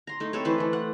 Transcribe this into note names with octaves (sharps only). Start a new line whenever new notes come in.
A#5 C6
A3 D#4
C4 A4 B4 C#5
E3 D#4 B4 C5
E3 A3
F#5